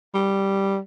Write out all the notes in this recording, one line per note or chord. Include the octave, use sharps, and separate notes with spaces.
G3